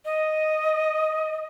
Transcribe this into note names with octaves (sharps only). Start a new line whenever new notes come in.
D#5